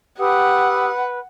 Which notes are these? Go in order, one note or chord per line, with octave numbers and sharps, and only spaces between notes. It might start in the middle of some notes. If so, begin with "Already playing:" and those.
G4 B4 F#5 D#6 E6